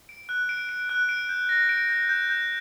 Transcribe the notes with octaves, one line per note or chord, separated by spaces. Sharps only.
D7
F#6
D7
D7
F#6
D7
G6
A#6
D7
G6
G6
G6